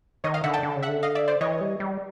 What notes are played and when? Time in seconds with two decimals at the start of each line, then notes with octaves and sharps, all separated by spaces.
0.24 D#3 C#5 D#5
0.34 D#5 F5
0.44 D3 E5 F#5
0.53 G5 A5
0.63 D3
0.76 C#3
0.83 E5 F#5
0.89 D3
1.03 D#5 F5
1.15 D5 E5
1.28 C5 D5
1.41 E3 C#5 D#5
1.61 G3
1.80 G3